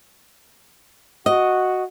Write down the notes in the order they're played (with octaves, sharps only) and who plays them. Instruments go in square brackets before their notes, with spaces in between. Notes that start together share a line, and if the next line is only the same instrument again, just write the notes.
[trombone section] F#4 [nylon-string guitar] D#5